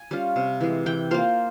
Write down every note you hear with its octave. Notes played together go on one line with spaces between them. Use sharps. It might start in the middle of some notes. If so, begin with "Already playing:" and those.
Already playing: G#5
G3 C#4 F4
C3
E3 G#3
E3 G5
A#3 F4 C5